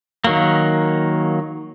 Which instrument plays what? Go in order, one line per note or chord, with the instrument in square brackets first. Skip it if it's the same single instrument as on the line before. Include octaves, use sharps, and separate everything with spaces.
[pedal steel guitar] D#3 F#3 A#3